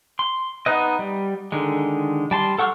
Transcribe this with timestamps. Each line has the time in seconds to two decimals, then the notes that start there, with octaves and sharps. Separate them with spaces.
0.19 C6
0.66 B3 D#4 B4 D#5
0.99 G3
1.52 D3 D#3 G#3
2.31 G3 A5 C6
2.58 A4 F#5 C#6 E6 F6